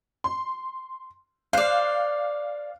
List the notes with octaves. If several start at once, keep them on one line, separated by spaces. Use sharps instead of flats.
C6
C5 D5 F5 F#6 C7